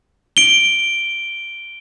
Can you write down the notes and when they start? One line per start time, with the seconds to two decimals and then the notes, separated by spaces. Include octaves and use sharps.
0.37 D7 G7